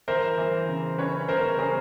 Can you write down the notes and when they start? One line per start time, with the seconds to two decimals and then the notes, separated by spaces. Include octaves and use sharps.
0.08 E3 A#4 C5
0.38 E3
0.68 C#3
0.98 C#4 B4 C#5
1.28 C#3 A#4 C5
1.59 C#4 G#4 A#4